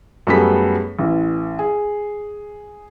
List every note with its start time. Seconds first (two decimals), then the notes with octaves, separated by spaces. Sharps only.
0.27 F#2 G3 A3 B3 G#4 B6
0.99 A1 E3
1.59 G#4